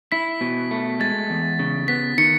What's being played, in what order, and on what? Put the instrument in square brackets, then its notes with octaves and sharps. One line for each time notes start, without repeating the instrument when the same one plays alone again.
[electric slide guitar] E4 [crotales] B6
[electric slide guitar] B2
A3
[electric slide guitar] G#3 [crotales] A6
[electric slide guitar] E2
C#3
[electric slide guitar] B3 [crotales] B6
[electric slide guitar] D#3 [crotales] C#7